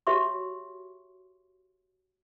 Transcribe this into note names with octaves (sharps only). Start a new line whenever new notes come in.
F#4 G4 C#5 E5 C6 C#6